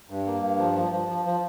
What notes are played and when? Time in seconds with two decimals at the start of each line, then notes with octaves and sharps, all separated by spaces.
0.10 G2
0.26 A#3
0.42 G2
0.58 F3
0.75 F3
0.92 F3
1.08 F3
1.25 F3